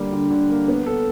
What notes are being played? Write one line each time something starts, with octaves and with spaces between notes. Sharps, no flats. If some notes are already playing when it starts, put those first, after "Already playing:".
Already playing: D3 G3 A#3
D3
D3
A#3
B3
A4